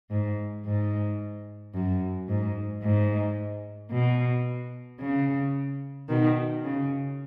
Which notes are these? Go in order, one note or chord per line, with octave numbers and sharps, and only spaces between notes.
G#2
G#2
F#2
G#2
G#2
B2
C#3
B2 D#3
C#3